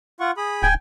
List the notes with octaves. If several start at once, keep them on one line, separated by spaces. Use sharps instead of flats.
F4 F#5 C#6
G#4 B5 D#6
D1 G5 G#5